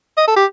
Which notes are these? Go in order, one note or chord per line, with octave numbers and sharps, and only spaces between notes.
D#5
A4
G4